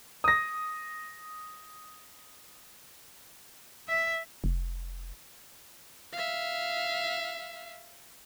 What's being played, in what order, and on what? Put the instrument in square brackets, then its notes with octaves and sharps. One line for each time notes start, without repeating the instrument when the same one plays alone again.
[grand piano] D#6 A#6
[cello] E5
[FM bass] F1
[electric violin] E5 F5